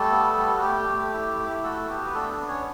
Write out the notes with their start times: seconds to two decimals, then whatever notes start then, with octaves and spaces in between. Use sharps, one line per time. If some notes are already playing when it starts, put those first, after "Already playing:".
Already playing: G3 A3 A4
0.11 B3
0.37 G3
0.57 F#4
0.62 A3 G4
0.88 A3
1.13 E4
1.39 E4
1.64 A3 F#4 A4
1.89 B3 G4
2.06 B4
2.14 A3 D4 A4
2.40 B3
2.48 C#4 C#5